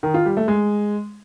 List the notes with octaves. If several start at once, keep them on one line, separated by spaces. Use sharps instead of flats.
D#3
F4
G3
A3
G#3